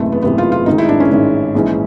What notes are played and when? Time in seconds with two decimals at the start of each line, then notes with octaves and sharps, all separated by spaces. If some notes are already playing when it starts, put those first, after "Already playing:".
Already playing: F#1 E2 C3 E3 A3
0.12 B3
0.22 F#1 E2 C3 E3 B3
0.38 F4
0.52 F4
0.66 A1 G#2 D#3 D#4
0.78 E4
0.89 D4
1.00 C#4
1.11 A1 G#2 D#3
1.55 A#1 G#2 E3